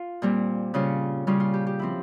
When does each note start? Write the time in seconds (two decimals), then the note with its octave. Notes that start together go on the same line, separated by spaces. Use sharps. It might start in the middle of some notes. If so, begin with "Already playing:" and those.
Already playing: F4
0.22 A#2 G3 C4
0.74 C#3 G3 C#4 F4
1.27 C#3 G3 C#4 F4
1.40 F4
1.54 G4
1.67 G4
1.79 F3 C4 E4